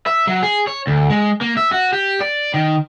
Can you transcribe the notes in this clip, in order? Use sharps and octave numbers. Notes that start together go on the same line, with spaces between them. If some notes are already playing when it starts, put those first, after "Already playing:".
E5
F#3
G#4
C#5
D2
G#3
A#3
E5
F#4
G4
D5
D#3